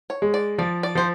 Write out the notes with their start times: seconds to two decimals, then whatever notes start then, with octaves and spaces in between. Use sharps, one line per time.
0.10 C#5
0.22 G#3
0.34 D5
0.58 F3 D5
0.83 D5
0.95 F3 C5